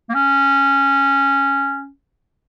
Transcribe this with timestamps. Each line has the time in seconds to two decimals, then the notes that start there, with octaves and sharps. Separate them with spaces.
0.09 A#3
0.14 C#4